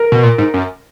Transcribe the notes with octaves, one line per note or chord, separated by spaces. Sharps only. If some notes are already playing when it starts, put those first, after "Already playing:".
Already playing: A#4
B2
A#2
G#2
F#2